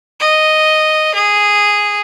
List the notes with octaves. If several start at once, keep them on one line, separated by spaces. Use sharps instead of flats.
D#5
G#4